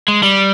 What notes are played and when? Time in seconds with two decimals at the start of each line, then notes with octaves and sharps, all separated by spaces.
0.08 G#3
0.23 G3